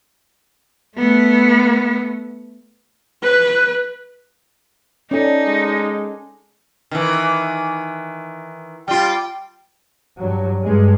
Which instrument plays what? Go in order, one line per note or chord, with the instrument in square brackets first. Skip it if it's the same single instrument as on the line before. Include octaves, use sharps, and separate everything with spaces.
[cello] A3 B3
[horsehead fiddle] B4
[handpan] C#4 A4 [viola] D#4 [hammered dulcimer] D5 G#5 A5
[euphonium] G#3
[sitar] D#3 E3
[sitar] G3 F4 [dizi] G5
[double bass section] G2 F#3
G2 G#3